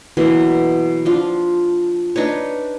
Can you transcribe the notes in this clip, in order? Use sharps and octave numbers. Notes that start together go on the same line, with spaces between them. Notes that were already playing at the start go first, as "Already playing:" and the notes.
B2 E3 F#3 A#3
F3 D4 F4
D4 D#4 B4 C#5